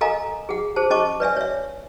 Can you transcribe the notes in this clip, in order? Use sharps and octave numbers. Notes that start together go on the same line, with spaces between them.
A4 A#4 D#5 F5 G#5 A#5
G#4 F#5
G#4 C5 A5
C#4 D#5 A5 C#6 D6
B4 D5 E5 G#5
C#5 E5